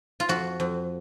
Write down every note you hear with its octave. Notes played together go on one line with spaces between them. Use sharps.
F4
F2 F#4
F2